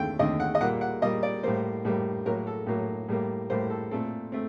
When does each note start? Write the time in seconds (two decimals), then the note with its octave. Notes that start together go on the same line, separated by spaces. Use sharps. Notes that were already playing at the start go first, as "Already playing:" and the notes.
Already playing: D#2 D3 A3 C4 G5
0.19 D#2 D3 A3 C4 D#5
0.40 F#5
0.55 D#5
0.61 A#2 G3 A#3 F#5
0.81 F#5
1.02 A#2 G3 A#3 D#5
1.23 D5
1.43 A2 G3 A#3 C5
1.85 A2 G3 A#3
2.26 A2 F#3 A#3 A#4
2.47 A4
2.67 A2 F#3 A#3
3.09 A2 G3 A#3
3.50 A2 G3 A#3 C5
3.70 A4
3.91 A#2 A3 C4 A4
4.32 A3 C4